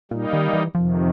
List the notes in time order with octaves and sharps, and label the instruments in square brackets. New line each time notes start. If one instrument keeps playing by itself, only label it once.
[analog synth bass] A#2 [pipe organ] G3 A#3 D#4
[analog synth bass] D#3
E3
[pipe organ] F2 C3 D#3 [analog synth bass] F3